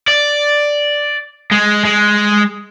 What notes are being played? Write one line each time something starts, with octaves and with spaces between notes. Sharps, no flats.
D5
G#3
G#3